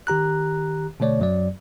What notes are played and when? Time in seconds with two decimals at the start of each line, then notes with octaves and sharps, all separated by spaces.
0.07 D#3 G4 A#5 F#6
1.00 B2 D3 A3 C#5 D5
1.19 F#2 F#3 D5